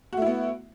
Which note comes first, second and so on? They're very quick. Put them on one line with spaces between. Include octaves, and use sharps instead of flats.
F#4 A3 E4 B3